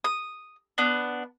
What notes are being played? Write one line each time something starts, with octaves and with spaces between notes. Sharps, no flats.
D#6
B3 D4